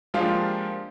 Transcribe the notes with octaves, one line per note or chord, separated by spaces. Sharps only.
F3 G#3 A#3 D4 F4 G4